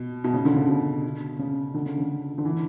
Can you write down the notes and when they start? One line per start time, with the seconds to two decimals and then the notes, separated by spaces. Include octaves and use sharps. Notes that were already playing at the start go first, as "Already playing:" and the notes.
Already playing: B2
0.24 B2
0.33 C#3
0.45 D3
0.56 C#3
0.68 B2
1.39 C#3
1.74 D3
1.86 C#3
1.98 D3
2.38 D3
2.45 E3